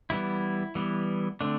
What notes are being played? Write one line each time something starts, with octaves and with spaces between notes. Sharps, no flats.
E3 G3 B3 E4
E3 G3 B3
D3 A3 C4 D4